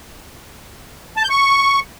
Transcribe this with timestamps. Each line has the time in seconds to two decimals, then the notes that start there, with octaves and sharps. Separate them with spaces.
1.17 A5
1.23 G6
1.30 C#6